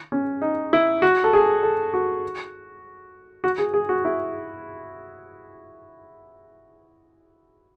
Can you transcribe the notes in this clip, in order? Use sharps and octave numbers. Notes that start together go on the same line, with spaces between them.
C#4
D#4
E4
F#4
A4
G#4
A4
F#4
F#4
G#4
G#4
F#4
E4